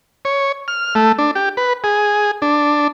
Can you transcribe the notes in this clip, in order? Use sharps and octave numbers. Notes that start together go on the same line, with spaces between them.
C#5
F6
A3
D4
G4
B4
G#4
D4